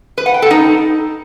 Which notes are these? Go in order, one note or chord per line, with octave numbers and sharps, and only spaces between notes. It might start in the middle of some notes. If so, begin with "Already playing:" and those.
B4
F#5
G5
A4
D#4